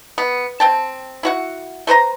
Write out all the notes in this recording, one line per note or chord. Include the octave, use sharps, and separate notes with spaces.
B3
C4 G5 A5
E4 F#4 F#5
A3 B4 C5 A#5